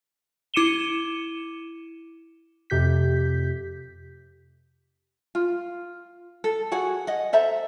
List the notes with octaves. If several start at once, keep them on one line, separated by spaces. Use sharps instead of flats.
E4 D6 C#7 D#7 E7 G7
F2 C3 G4 G6 B6
F4
A4
F#4 G#4 F#5
D#5 F#5
A4 C5 E5 A#5